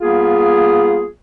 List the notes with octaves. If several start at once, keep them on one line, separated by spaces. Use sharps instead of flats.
G3 A#3 B3 F4 G#4